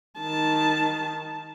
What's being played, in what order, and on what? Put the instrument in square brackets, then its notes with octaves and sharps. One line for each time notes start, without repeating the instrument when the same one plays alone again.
[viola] D#3 A5